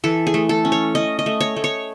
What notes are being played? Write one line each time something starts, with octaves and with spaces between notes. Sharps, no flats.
E3 A4
G#4
A3
A4
C#4
C#5
C#4 D#5
D#5
A3
C#5
A3
C#5